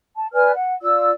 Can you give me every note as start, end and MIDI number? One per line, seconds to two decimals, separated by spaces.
0.16 0.28 81
0.33 0.52 71
0.33 0.52 74
0.33 0.52 80
0.33 0.52 89
0.55 0.75 78
0.82 1.11 65
0.82 1.11 74
0.82 1.11 88